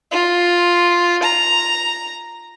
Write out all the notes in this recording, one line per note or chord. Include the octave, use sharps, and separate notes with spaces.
F4
A#5